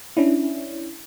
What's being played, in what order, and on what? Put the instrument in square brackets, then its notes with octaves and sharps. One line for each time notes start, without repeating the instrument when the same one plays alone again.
[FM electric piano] C#4 D4 E4